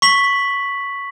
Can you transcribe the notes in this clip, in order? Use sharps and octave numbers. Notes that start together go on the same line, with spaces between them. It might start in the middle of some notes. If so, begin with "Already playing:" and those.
C#6 B6 F#7